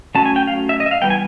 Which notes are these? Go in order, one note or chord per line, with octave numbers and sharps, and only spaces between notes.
F#3 A3 C#4 A5
G#5
G5
F5
E5
D#5
E5
F5
E3 G3 B3 G5
G#5